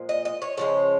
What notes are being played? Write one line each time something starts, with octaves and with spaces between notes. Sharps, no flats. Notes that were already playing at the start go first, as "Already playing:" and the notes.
Already playing: A#2 F3 G#3
D#5
D#5
C#5
C#3 F3 G#3 C#5